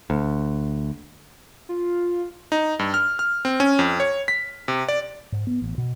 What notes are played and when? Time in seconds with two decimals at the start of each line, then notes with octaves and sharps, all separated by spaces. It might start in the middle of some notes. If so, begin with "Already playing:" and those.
0.10 D2
1.69 F4
2.52 D#4
2.79 G2
2.94 F6
3.19 F6
3.45 C4
3.60 C#4
3.79 F2
4.00 C#5
4.28 B6
4.68 C3
4.89 D5
5.32 G#2
5.47 B3
5.62 A1
5.78 B2